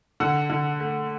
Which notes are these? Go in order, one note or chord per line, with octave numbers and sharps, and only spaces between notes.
D3 F#5
D3
A3